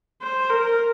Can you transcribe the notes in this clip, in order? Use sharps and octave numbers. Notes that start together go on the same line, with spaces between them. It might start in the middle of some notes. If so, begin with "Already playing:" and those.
C5
A#4